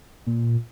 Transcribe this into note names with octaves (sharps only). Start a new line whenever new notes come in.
A#2